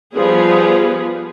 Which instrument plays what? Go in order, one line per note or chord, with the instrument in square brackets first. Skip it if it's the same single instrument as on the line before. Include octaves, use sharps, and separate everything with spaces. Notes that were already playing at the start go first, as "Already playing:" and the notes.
[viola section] F3 G3 B3 G#4 B4